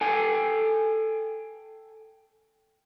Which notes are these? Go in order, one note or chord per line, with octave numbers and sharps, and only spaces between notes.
A4 G5 G#5